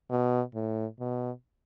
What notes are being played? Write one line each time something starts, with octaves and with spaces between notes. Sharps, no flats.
B2
A2
B2